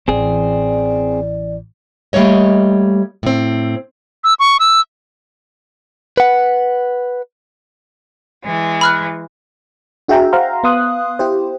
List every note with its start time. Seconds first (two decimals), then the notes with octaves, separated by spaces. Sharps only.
0.08 A1 E3 C4 G#4 D5
2.13 G3 A3 A#3 C#5 D#5
3.23 A2 C4
4.24 E6
4.40 C#6
4.60 E6
6.17 B4 F#5
8.45 E3 G#3
8.81 B5 F6 F#6
10.08 D4 F#4 G#4 E5 G5 A#5
10.33 C5 F5 F#5 A#5 C6
10.64 B3 F5 C6 D#6 F#6
11.19 E4 G4 C5